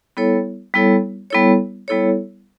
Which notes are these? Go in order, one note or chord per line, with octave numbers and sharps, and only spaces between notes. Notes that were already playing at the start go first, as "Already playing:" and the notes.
G3 B3 E4 A4 C#5
G3 B3 E4 A4 C#5
G3 B3 E4 A4 C#5
G3 B3 E4 A4 C#5